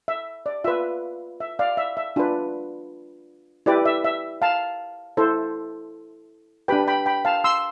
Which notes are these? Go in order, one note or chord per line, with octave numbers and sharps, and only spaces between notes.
E5
D5
F4 B4 E5
E5
D5 F5
E5
E5
D4 F4 B4
E4 G4 B4 D5
E5
E5
F5 A5
E4 A4 C5
D4 G4 B4 G5 B5
G5 B5
G5 B5
F5 A5
C6 E6